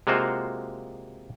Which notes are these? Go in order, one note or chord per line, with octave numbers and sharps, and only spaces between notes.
C3 G#3 A#3 F4 F#4 C5